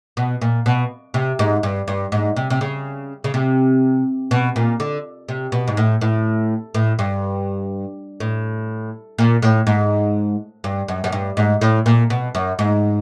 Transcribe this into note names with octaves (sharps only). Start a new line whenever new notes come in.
B2
A#2
B2
C3
G#2
G2
G2
G#2
C3
C3
C#3
C#3
C3
B2
A#2
D3
C3
B2
G#2
A2
A2
A2
G2
A2
A#2
A2
G#2
G2
F#2
F#2
G2
G#2
A2
A#2
B2
F#2
G#2